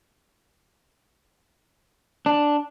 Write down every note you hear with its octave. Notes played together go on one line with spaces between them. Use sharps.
D4